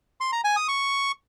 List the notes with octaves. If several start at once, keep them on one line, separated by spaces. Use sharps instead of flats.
C6
A#5
G#5
D#6
C#6